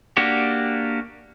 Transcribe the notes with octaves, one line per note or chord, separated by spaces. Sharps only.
A#3 D4 F#4 G4